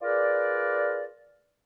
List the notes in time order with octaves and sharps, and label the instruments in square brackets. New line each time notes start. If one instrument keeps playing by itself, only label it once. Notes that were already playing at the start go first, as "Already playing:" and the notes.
[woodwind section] F4 G#4 A#4 B4 D5